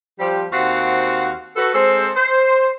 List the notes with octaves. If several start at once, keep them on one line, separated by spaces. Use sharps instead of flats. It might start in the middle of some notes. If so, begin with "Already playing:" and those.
F3 G3 C4 G4
D#2 C4 F#4 C5 F5 F#5
F#4 A4 B4
G#3 C4 A4 C5
C5